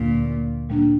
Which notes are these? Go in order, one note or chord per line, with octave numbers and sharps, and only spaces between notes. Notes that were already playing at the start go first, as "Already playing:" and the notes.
Already playing: D2 A#2 D3 G3
A#2 G3 A#3 D4